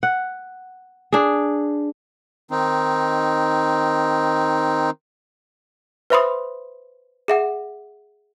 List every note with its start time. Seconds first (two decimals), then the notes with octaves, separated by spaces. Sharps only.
0.03 F#5
1.13 D4 G#4
2.51 D#3 C4 D#4
6.10 B4 C5 E5 B5 C6 D#6
7.28 G#4 E5 F#5